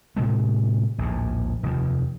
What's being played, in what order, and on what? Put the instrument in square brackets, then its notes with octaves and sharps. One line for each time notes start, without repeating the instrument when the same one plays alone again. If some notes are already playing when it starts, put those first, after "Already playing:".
[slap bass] A2 C3 G#3 A3
A#1 D#2 A2
F1 D#2